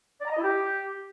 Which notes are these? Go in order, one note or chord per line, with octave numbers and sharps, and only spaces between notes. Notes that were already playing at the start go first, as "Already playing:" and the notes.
D5
A#5
D#5
E4
G4